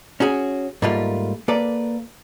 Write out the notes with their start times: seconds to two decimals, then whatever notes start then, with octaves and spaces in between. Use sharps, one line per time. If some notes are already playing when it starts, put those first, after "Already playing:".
0.20 C#4 F#4 G#4
0.82 G#2 G3 A3 A#3 F4
1.48 A#3 A4 B4 D5